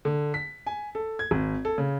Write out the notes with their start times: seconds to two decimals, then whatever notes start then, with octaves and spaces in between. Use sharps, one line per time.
0.05 D3
0.34 B6
0.66 G#5
0.95 A4
1.19 G#6
1.31 G#1
1.65 A4
1.78 C#3